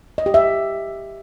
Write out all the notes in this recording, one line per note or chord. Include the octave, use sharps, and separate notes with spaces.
D#5
G4
E5